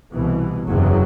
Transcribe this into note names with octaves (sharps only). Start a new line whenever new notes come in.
C2 B2 E3
F#1 E2 C3 F#3